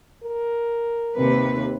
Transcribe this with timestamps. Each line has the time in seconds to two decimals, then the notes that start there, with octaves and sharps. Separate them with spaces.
0.24 A#4
1.15 D#2 C3 B4